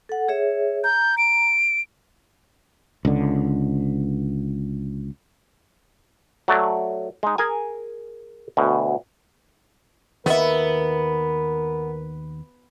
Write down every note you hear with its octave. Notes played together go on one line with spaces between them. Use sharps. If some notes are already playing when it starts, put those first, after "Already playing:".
A4 F#5
G#4 C#5 E5
A#5 G6
D7
C#2 D3
F#3 A3 D5
G#3 D#4
G#4 A#4 G#5
D2 B2
D#2 B3 A#4 E5